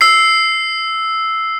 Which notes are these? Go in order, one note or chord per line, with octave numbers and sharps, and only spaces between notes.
E6 C7